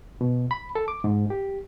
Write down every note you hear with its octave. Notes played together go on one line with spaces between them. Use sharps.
B2
B5
A4
D6
G#2
G4